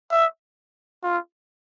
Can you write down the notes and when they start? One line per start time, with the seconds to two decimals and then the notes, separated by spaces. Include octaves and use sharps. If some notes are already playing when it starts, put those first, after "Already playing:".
0.12 E5
1.04 F4